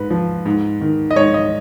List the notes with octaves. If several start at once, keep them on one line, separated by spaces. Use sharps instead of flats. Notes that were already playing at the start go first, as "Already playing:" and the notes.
Already playing: G#2 B4
F3
G#2
D#3
D#5
G#2 C#5
D#5